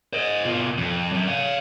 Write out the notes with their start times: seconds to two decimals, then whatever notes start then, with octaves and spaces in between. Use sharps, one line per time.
0.13 C5 D#5
0.45 B2 F4
0.78 F2
1.12 F#2
1.28 F5 G#5